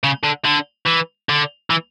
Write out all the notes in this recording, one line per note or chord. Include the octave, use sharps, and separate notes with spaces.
C#3
D3
D3
E3
D3
E3